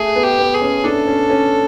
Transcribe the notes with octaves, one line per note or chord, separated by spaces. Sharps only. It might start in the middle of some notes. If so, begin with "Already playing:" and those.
Already playing: A3 G#4
B3
G4
B3
G#4
C#4
D4 A4
C#4
C#4